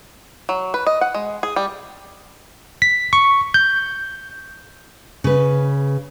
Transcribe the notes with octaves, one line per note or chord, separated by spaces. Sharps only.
F#3
B4
D#5
F#5
G#3
G#4
G3
B6
C#6
G6
C#3 B4